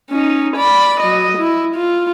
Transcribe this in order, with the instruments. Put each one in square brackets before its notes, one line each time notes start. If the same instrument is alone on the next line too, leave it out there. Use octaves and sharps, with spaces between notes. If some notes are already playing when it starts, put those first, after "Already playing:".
[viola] C#4 D#4
D5 B5
F#3 D#5
E4
F4